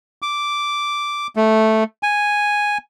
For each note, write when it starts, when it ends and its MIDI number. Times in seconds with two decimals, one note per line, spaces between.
0.22 1.27 86
1.36 1.84 57
2.03 2.78 80